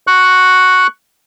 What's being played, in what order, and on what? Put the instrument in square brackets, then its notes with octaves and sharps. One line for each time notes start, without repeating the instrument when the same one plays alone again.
[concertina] C#6 F#6